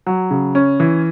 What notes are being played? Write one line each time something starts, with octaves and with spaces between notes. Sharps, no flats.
F#3
C#3
C#4
E3